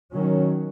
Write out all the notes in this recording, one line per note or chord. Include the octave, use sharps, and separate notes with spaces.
D#3 F#3 C#4